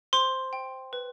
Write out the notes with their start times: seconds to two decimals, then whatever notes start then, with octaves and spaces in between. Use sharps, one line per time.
0.13 C5 C6
0.53 G5
0.93 B4